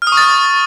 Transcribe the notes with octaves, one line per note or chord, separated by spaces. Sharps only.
F6
D#6
C#6
A6